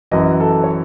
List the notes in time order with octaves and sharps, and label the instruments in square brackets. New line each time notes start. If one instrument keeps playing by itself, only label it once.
[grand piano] F#2 E3 D#5
A4
C#5